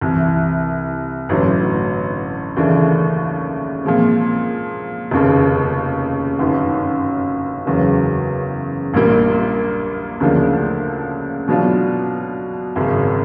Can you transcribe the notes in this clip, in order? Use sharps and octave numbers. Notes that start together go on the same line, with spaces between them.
C2 C3 E3
A1 G2 D3 F#3
D#2 C#3 E3 A3 D4
A#2 F3 G#3 C4
F1 D#2 C#3
G1 F#2 D#3
F#1 E2 C#3 F#3
A#1 A#2 G3 A#3
D2 C#3 F3 A#3 D4
B2 F#3 B3 D4 F4
G#1 F#2 C#3